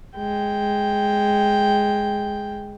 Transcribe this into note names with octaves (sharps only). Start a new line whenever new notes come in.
G#3 G5